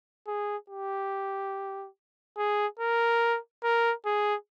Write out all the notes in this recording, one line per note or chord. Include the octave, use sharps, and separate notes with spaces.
G#4
G4
G#4
A#4
A#4
G#4